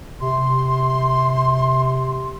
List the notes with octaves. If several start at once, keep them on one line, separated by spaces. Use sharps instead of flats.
C3 C6